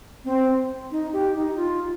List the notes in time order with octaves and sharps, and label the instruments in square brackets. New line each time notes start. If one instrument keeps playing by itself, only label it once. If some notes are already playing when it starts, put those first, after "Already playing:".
[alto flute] C4
D#4
G4
D#4
F4